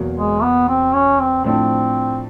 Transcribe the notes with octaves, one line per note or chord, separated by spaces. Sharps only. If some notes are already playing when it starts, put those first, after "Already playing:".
Already playing: E2 B2 F#3 A#3
G#3
B3
C4
C#4
C4
A2 F3 A3 C4 D4